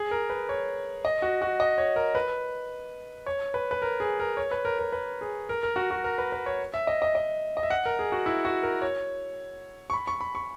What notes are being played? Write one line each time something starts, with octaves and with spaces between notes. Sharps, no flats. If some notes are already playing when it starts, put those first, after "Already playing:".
Already playing: G#4
A#4
B4
C#5
D#5
F#4
F#4
D#5
C#5
A#4
B4
C#5
B4
B4
A#4
G#4
A#4
C#5
B4
A#4
A#4
B4
G#4
A#4
A#4
F#4
F#4
A#4
B4
B4
C#5
E5
D#5
D#5
D#5
D#5
E5
F#5
A#4
G#4
F#4
E4
F#4
A#4
C#5
C#6
B5
C#6
B5
C#6